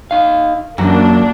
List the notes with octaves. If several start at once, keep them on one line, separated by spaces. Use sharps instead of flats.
D#4 F5
F#2 E3 F#3 A#3 D4 F#4